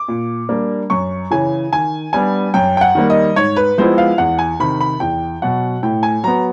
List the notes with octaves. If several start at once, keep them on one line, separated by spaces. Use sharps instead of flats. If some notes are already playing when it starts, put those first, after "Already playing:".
Already playing: D6
A#2
G3 A#3 D4
F#2 C#6
C#3 E3 G#5
D#3 G#5
G3 B3 D4 G#5
F#2 G5
G5
F#5
D#3 G3 A#3
D#5
G#2 C#5
B4
F3 G#3 B3 E4 C5
F5
E2 F#5
G#5
C3 D#3 B5
B5
E2 G5
B2 F#3 F#5
A2 G5
G#5
F#3 B3 A#5